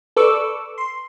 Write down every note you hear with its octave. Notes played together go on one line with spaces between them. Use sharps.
A4 B4 D5 C#6 D6 E6
C6